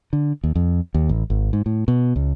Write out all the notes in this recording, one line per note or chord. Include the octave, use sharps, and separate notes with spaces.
D3
D#2
F2
D#2
A1
G#1
G#2
A2
B2
C#2